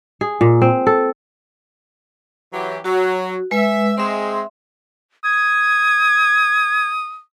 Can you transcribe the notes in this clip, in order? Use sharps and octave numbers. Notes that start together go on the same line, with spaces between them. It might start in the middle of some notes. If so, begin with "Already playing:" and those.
G#4
A#2
C4
A4
E3 F#3 G4
F#3 F#4
G#3 B4 E5
G#3 C4 E5 C6
D#6 G#6